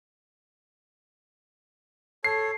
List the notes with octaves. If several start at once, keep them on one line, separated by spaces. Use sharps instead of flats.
A4 C#5 C7